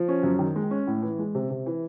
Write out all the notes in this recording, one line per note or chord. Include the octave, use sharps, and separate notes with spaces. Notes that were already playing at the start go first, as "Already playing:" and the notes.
Already playing: F3
C#4
F#2
D#3
G#3
C#4
A2
E3
G#3
C3
C3
E3